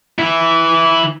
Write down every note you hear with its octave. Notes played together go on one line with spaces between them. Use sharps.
E3 E4